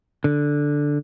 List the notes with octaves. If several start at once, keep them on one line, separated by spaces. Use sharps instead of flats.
D3